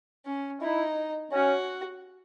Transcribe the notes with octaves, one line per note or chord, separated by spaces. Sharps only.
C#4
D#4 E4
C#4 F#4